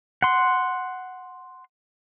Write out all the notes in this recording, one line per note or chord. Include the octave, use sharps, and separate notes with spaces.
F#5 C6